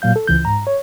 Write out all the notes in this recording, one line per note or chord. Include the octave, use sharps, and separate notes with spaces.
A#2 F#3 F5 G6
A4
C#2 E3 G6
G#2 A#5
C#5